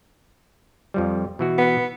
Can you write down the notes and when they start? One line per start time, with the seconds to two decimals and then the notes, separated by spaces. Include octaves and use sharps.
0.94 F2 F3 G3
1.39 B2 E3 F#4
1.58 B3